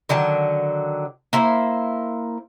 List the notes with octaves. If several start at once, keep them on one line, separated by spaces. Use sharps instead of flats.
D3 D#3 F#3 A5
A#3 E4 C5